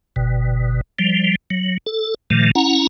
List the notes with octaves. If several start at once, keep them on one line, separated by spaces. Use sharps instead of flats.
G1 B2
F3 G3
F#3
A4
A#2 D#3 F3 A3
C#4 E4 F#5 A#5